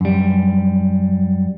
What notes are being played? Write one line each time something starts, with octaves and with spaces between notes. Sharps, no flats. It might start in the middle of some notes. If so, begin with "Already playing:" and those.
F#2 G3